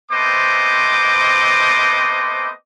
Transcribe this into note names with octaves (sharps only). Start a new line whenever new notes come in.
A3 B3 C4 C5 D#5 D6